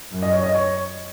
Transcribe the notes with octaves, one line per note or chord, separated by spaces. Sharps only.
F#2
D#5
C#5
D#5
C#5